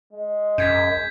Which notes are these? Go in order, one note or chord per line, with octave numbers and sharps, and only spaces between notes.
G#3
F#2 G6 G#6 B6